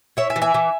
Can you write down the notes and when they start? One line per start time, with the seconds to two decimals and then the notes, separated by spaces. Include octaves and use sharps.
0.17 E4 C#5 E5
0.30 E5 G#5
0.36 E3
0.42 E5 G#5
0.54 E3